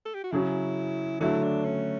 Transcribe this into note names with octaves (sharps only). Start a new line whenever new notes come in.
A4
G4
F#4
C#3 F#3 C#4 E4
D3 F#3 A3 E4
D4
C#4